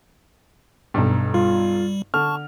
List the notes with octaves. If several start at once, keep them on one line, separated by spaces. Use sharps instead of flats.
B1 G2
G3 F4
D3 A5 C#6 F6